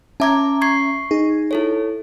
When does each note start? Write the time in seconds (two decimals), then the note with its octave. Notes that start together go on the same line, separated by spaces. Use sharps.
0.20 C#4 E5 A5 A#5 D6 G#6
0.61 C#6 G#6 C7
1.11 D#4 G#4
1.51 E4 A4 C#5